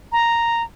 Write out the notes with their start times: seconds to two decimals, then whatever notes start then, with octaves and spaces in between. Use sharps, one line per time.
0.12 A#5